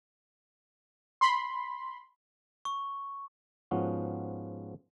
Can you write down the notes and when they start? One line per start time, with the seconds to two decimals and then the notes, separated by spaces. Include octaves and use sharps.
1.21 B5 C6
2.65 C#6
3.71 G#2 F3 B3 C#4 F4 F#4